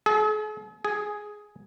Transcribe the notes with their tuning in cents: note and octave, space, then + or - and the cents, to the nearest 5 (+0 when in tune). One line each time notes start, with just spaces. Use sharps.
G#4 +45
G#4 +5